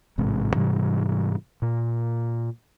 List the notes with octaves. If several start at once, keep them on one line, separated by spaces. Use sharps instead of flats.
A1 G#2 C3 G#3
G#2 C3 E3 G3
A#2